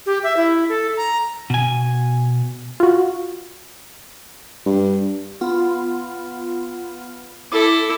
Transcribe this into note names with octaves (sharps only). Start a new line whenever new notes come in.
G4
E5
E4
A4
A#5
B2 G#5
F4 F#4
G2
B3 F4
E4 A4 D6